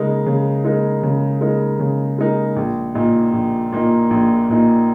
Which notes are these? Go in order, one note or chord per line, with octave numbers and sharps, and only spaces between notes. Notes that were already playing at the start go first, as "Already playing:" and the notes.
Already playing: C#3 G#3 D#4 A#4
C#3
G#3 D#4 A#4
C#3
G#3 D#4 A#4
C#3
G#3 D#4 A#4
A#1
A#2 A#3 D#4
A#1
A#2 A#3 D#4
A#1
A#2 A#3 D#4